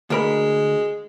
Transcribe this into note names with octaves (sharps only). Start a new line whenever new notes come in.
D2 G#3 A#4 B5